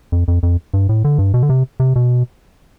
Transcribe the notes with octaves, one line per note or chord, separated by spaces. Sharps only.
F2
F2
F2
G2
A2
D3
G2
B2
D3
C3
C3
B2